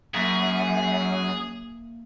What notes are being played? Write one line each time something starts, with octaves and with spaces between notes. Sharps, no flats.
F#2 A#3 G#4 E5